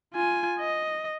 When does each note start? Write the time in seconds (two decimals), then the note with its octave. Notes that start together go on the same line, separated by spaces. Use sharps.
0.14 F4 G#5
0.59 D#5